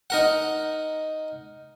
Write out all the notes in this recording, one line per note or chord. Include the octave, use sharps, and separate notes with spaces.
D#4 A#4 F#5